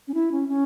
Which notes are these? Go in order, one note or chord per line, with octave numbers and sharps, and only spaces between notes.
C#4
E4
C#4
C#4